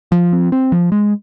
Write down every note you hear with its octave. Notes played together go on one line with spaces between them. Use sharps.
F3
C4
C4
F3
G#3